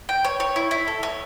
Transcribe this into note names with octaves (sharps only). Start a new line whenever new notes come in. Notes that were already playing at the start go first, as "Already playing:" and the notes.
G5
C#5
C#5
E4
E4
A4
C#5